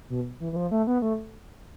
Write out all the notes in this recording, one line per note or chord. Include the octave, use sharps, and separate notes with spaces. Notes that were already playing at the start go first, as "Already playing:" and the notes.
B2
E3
E3
F3
A3
B3
A3